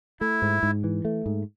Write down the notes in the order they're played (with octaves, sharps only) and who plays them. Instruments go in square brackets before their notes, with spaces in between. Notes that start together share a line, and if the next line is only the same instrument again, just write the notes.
[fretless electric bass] A3 [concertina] E4
[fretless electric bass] G#2
G#2
E3
A3
G#2